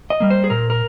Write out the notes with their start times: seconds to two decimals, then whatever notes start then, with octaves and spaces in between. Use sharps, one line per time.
0.10 D#5
0.20 G3 A#3
0.30 C5
0.44 G#4
0.50 A#2 A#4
0.70 A#4